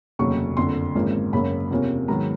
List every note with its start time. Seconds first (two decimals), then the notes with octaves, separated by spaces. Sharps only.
0.19 F1 D#2 C#3 F#3 C#6
0.57 F#1 F2 D3 C6
0.95 G#1 G#2 F3 A#3 C#4
1.33 F#1 F#2 C#3 F#3 A#3 B5
1.70 E2 C3 F3 A#3 C#4
2.08 G#2 D#3 F#3 B3 A#5